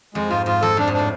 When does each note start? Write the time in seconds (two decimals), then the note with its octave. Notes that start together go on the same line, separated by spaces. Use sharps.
0.14 F2 G#3
0.30 G#2 F4
0.46 G#2 F4
0.62 F2 A4
0.77 F2 D4
0.88 G#2
0.93 D4
0.99 A2